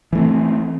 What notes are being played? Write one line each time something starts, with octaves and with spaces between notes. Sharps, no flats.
E3 A3 C4